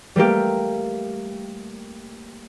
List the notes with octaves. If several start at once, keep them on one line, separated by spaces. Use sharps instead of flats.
G3 A3 A#3 G4